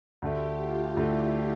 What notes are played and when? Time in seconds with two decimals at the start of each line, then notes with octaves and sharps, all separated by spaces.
0.22 D2 D3 A3 G4
0.60 F4
0.97 D2 D3 A3 E4